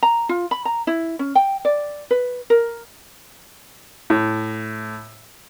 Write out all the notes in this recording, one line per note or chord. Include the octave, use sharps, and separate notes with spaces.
A#5
F4
B5
A#5
E4
C#4
G5
D5
B4
A#4
A2